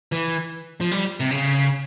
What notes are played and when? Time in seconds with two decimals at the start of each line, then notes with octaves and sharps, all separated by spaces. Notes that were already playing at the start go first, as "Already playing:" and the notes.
0.12 E3
0.81 F3
0.91 G3
1.20 C3
1.31 C#3